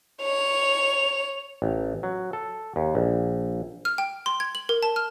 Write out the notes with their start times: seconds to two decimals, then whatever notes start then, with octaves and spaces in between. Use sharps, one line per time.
0.22 C#5 F7
1.62 A1
2.03 F#3
2.33 A4
2.76 D#2
2.95 A#1
3.85 F6
3.98 G5
4.26 C6
4.40 G#6
4.55 F#7
4.69 A#4
4.83 A5
4.96 F6